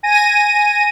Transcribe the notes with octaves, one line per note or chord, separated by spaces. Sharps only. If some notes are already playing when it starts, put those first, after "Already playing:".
G#5 A#6 D#7